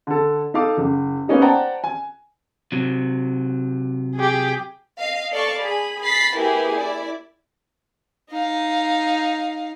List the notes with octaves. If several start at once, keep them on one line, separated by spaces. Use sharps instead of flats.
D3 A4
D#4 A4 F5 D6
F#1
A#3 B3 C#4 D#4 G4
C5 D5 F#5 G5 A5 A#5
G#5
C3 F#3
G4 G#4
D#5 F5
A4 D5 F5 A5 C#6
G#4 B5
B5 A6 B6 C7
A#3 E4 G4 G#4 B4
E4 D5
D#4 F5